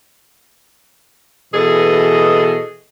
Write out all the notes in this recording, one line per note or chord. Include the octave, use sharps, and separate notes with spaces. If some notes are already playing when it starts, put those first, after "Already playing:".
B2 E3 G#4 A4 D#5